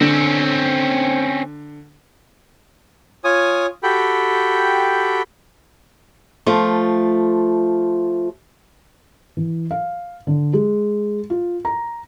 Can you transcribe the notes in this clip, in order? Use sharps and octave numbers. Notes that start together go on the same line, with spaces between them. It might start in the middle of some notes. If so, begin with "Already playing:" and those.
D3 C4 C#4
F4 C#5 G#5 D#6
F#4 G4 A4 G5 B5
F3 A3 F4
E3
F5
D3
G#3
F4
A#5